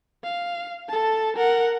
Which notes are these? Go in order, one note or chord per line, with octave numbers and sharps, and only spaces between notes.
F5
A4 A5
A#4 F#5